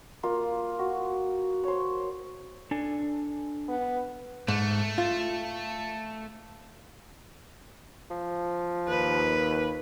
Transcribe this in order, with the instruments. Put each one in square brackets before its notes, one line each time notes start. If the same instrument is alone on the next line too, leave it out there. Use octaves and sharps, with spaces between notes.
[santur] A#3 F4
F#4
C5 C#5
[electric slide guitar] D4 A4 G#5
[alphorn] B3
[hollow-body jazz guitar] G#2 [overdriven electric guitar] A3
[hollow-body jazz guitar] F4
[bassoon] F3
[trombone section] D#2 [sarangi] B4